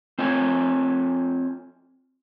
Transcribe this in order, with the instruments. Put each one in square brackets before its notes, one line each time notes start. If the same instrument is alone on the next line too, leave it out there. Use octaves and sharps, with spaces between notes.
[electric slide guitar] C4 F4 C#5 G#5